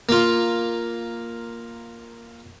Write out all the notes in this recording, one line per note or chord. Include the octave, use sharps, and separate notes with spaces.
A#3 F4